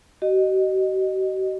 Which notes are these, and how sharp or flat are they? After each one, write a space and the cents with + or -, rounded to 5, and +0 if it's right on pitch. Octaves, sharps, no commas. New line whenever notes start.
F#4 +45 D#5 -10